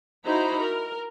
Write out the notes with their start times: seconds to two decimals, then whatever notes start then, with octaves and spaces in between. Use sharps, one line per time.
0.25 D#4 E4 F#4 C5 A#5 B5
0.62 A#4